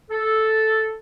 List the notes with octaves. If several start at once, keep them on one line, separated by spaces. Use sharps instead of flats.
A4